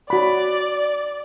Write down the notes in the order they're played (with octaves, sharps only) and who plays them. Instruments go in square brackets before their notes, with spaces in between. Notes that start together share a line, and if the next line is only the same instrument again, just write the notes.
[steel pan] F#4 B5 [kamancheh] D5